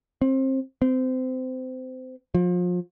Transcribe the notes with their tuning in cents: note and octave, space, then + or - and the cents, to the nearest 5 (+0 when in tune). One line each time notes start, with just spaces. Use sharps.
C4 +25
C4 -25
F3 +30